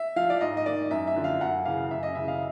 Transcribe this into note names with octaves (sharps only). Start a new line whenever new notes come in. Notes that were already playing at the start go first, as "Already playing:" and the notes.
Already playing: E5
F3 F5
D5
G#2 D#5
D#5
D#3 D5
F#2 E5
E5
D3 F3
F5
F#2 F#5
C#3 E3 F5
F#2 E5
D#5
C#3 E3 E5
F5